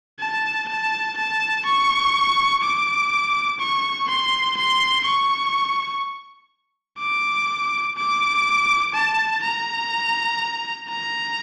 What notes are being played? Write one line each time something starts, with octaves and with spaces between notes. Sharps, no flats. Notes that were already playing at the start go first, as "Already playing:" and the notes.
A5
A5
A5
C#6
D6
C#6
C6
C6
C#6
D6
D6
A5
A#5
A#5